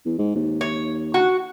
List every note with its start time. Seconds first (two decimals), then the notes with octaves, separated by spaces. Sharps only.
0.06 E2
0.19 G#2
0.36 D#2
0.61 C#5
1.14 F#4